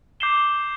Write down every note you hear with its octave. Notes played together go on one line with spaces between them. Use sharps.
D6 G6 C7 E7 G7